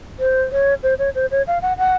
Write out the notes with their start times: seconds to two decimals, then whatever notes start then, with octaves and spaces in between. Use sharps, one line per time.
0.20 C5
0.52 C#5
0.83 C5
0.99 C#5
1.15 C5
1.31 C#5
1.47 F5
1.62 F#5
1.78 F#5